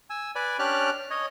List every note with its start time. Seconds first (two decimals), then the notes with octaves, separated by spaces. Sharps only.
0.10 G#5 E6
0.35 B4 D5 G#5
0.59 C#4 D4 G4 D5 F6 F#6
1.10 C#5 D#5